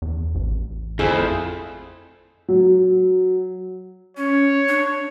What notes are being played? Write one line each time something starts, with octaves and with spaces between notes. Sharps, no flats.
E2
A1
F2 A3 E4 G#4 C5
F#3
C#4 C#5
D4